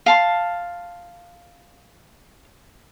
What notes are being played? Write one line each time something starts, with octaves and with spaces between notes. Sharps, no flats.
F5 A5 C6